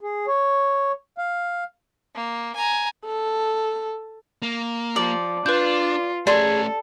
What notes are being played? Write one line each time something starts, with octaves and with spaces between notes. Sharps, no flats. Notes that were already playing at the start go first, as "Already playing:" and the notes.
G#4
C#5
F5
A#3
G#5 A#5
A4
A#3
F3 D5
D4 F4 B4 G6
A3 C#4 G#4 A4 D5 C6